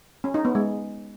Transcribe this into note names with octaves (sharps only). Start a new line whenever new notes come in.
C#4
D#4
B3
G#3